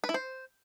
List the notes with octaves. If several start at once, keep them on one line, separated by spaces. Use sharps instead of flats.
B4
E4
C5